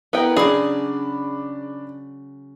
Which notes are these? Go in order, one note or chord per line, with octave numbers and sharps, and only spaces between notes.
B3 E4 A#4 G5
C#3 F#3 D4 G#4 D5 B5